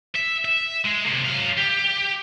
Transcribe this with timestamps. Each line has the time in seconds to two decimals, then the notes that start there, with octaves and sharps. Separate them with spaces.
0.15 E5
0.45 E5
0.84 G#3
1.05 C3 A#3
1.25 F#3 F5
1.57 G4